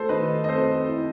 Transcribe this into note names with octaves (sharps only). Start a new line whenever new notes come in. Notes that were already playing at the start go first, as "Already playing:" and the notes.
Already playing: A3 A4 C5
D#3 B4 D#5
D#5
C4 A4 C5
E4